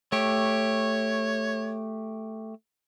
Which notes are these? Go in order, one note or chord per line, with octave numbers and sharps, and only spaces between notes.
A3 G4 C#5